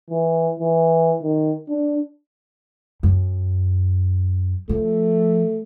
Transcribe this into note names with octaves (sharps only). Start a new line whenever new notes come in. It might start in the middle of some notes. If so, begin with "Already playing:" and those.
E3
E3
D#3
D4
F#2
F3 A3